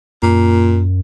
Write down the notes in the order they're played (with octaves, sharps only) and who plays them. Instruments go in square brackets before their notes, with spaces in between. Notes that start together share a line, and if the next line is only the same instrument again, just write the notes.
[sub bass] F#2 [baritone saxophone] A#2